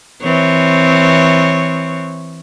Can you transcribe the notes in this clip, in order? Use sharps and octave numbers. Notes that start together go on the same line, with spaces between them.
E3 C4 C#5